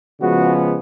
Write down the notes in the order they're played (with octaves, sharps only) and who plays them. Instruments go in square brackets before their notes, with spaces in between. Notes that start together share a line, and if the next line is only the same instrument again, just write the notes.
[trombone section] C#3 F3 G#3 B3 F#4